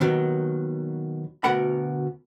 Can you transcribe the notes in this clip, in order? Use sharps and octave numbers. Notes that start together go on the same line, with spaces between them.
D#2 B2 D#3 F#3
D2 B2 A#4 F#5 B5